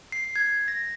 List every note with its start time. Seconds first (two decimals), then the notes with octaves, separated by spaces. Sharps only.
0.12 C7
0.36 G#6
0.68 A#6